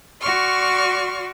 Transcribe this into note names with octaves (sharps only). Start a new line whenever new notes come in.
F#4 D5 C6 C#6 F6